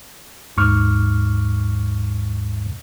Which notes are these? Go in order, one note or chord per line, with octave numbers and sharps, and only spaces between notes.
A1 D#2 G#2 C#6 D6 F6